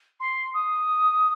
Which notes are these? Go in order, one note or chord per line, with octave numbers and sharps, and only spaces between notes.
C6
D#6